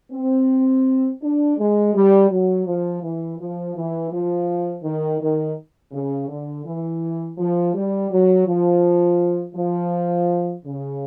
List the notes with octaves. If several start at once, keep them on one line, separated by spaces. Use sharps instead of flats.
C4
D4
G#3
G3
F#3
F3
E3
F3
E3
F3
D#3
D#3
C#3
D3
E3
F3
G3
F#3
F3
F3
C#3